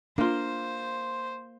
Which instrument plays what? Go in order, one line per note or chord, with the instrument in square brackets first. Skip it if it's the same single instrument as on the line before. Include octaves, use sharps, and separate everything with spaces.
[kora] A#3 F4 [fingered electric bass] D4 [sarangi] C5